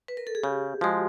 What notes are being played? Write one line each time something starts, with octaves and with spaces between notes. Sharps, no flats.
B4
A#4
A4
G#4
C#3 G4
F3 G#3 F#4